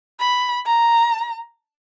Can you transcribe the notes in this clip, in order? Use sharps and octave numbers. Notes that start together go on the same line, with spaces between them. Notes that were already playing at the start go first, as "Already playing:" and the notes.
B5
A#5